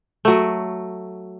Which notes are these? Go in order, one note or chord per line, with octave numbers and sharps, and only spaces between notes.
F#3 A3